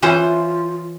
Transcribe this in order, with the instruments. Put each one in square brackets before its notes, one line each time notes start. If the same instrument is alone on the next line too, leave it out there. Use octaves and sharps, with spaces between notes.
[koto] E3 C#4 C5 [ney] F4